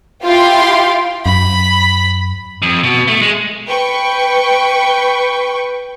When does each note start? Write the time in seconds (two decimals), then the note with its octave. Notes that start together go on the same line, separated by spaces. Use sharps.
0.23 E4 F4 G4 F5 G5 C6
1.26 F#2 B5
2.62 F2
2.84 B2
3.07 A3
3.22 G#3
3.66 B4 G5 C#6